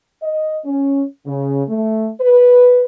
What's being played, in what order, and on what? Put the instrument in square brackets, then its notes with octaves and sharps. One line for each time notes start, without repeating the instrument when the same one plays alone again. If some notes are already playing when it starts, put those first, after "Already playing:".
[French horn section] D#5
C#4
C#3
A3
B4